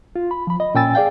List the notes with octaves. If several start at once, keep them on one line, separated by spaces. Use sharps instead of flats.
F4
B5
F3 B5
D#5
A#2 C#4 G5 G#5 E6 A6
G#4 D5 F5 G5